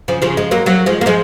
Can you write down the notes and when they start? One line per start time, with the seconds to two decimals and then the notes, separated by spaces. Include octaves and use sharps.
0.08 C#3 F3
0.22 C#3 F3
0.37 F3 G#3
0.51 F#3 A#3
0.66 F#3 A#3
0.86 F3 G#3
1.01 A#3
1.06 F3 G#3